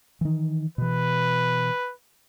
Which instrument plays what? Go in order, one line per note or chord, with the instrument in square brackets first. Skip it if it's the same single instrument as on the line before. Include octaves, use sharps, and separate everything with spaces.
[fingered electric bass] D#3 E3
[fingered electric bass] B2 E3 [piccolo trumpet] B4